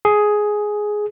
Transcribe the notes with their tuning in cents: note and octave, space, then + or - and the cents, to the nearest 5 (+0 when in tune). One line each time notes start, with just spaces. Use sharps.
G#4 +5